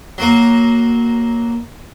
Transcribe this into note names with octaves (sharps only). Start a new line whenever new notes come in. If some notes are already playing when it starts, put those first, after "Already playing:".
F#3 A#3